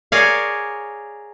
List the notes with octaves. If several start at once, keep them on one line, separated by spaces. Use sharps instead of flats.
G#4 A#4 C#5 D5 F5